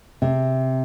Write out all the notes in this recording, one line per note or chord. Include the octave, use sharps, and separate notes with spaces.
C3